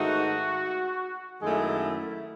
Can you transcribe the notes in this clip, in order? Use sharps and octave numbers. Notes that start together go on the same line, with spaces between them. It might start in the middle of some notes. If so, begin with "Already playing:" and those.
Already playing: G#2 D#3 A3 D#4 F#4
F#2 D#3 G#3 A3 E4 G#4
E4